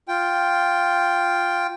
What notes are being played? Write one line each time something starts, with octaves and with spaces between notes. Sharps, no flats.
F4 G5